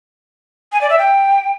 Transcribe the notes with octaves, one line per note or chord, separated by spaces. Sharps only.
G#5
D5
E5
G5